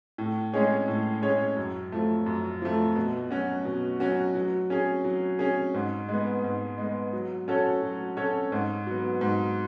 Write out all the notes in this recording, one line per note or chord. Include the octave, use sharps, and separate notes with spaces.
A2
G#3 C#4 G#4 C#5
A2
G#3 C#4 G#4 C#5
F#2
F3 A3
F#2
F3 A3
B2
F#3 C#4 F#4
B2
F#3 C#4 F#4
F#3
C#4 G#4
F#3
C#4 G#4
G#2
G#3
B3
G#2
G#3 B3
F#3
C#4 F#4 A4 C#5
F#3
C#4 F#4 A4 C#5
G#2
F#3 B3
G#2